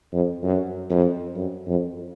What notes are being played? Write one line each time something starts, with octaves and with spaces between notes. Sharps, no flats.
F2
F#2
F2
F#2
F2